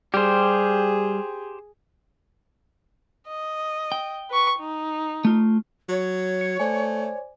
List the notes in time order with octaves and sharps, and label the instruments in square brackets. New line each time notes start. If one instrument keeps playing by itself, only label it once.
[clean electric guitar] G3 [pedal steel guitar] G4 C5 [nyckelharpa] G#4
[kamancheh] D#5
[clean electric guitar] G5
[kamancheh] B4 C#6
D#4
[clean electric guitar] A3 F4
[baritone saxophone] F#3 [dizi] C#5
[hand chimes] C#7
[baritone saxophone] A3 [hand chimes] C5 D5 G#5